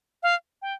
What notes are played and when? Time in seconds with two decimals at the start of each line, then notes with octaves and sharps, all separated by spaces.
0.23 F5
0.62 G5